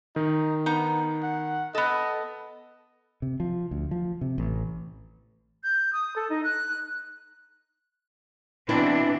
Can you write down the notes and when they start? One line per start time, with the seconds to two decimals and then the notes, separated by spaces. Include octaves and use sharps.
0.16 D#3 D#4
0.66 B3 D#4 A#5
1.23 F#5
1.75 B3 A4 D#5
3.22 C3
3.40 F3
3.71 D2
3.91 F3
4.21 C3
4.38 A1
5.64 G6
5.93 D#6
6.15 A4
6.29 D#4
6.43 F#6
8.69 B2 E3 C4 D4 E4